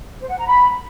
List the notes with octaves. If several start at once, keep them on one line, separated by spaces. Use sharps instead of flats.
C5
F#5
A#5
B5